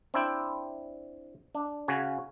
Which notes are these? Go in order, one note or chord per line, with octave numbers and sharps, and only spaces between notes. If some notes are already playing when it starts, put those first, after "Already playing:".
C4 D4 E4 G5
D4
C#3 F#4 G#5